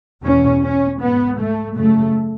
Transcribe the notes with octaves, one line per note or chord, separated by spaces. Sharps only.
E2 B2 C#4
C#4
G#2 B3
A3
F#2 C#3 A3